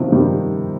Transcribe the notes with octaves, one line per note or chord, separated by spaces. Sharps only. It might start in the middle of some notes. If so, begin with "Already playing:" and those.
Already playing: C3 D#3 F3
D#3 G3